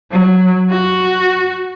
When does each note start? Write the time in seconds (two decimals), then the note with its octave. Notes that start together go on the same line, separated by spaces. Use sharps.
0.12 F#3
0.70 F#4